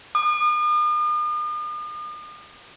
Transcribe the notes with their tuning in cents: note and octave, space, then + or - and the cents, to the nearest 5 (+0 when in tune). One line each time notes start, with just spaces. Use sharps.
D#6 -45